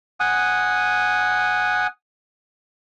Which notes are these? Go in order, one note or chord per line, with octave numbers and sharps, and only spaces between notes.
F#5 G#5 D#6